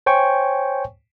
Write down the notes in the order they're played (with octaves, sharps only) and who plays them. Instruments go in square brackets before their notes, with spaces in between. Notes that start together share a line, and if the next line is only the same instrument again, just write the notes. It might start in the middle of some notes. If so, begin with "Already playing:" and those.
[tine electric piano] C5 C#5 G5 G#5 C#6